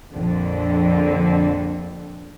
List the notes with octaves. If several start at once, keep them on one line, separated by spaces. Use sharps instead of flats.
A#1 F2 D3